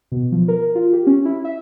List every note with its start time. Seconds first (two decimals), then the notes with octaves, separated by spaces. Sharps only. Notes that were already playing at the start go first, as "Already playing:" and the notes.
0.12 B2
0.32 F3
0.48 A#4
0.75 F4
0.93 G4
1.07 C#4
1.25 E4
1.45 E5